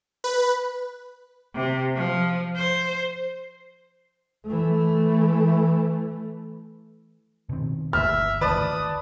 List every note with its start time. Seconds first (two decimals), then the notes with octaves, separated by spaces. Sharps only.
0.24 B4
1.55 C3
1.96 F3
2.56 C5
4.46 E3 A3
7.49 B2 D#3 C4
7.93 G1 D2 E5 F6
8.41 G#1 D2 E3 B4 D5 A5 D#6